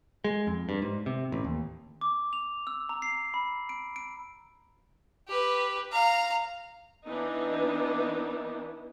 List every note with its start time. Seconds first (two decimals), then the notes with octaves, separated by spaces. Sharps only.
0.24 G#3
0.47 F2
0.69 G2
0.82 G#2
1.06 C3
1.32 A1
1.44 D#2
2.01 D6
2.33 F7
2.67 E6
2.89 A#5
3.02 C7
3.34 B5
3.69 D7
3.96 D7
5.28 G4 B4
5.92 F5 A#5
7.05 E3 B3 D4 D#4